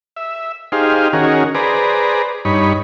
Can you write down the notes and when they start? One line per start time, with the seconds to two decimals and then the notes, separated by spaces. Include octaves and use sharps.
0.16 E5
0.72 D#4 G4 G#4 C5 F5
1.13 D#3 C#4 F#4 G#4 A#4
1.55 G#4 B4 C5 D5 A#5
2.45 G2 D#4 C#5 B5